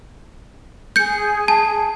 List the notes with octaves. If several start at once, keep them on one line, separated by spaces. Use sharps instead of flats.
G#4 G6 C#7
A5